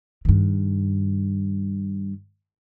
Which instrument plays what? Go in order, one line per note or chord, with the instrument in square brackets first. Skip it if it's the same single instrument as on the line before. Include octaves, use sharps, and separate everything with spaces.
[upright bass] G2 D#3